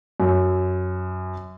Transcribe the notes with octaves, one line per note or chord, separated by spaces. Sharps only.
F#2